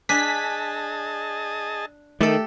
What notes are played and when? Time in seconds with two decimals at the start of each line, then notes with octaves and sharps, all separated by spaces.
0.09 D4 G#4 D#5 G#5 A5 B6
2.20 D#3 A3 G4 A4